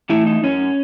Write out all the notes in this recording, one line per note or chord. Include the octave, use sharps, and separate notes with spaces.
E3 A3 E4
D#4
F#2 C#4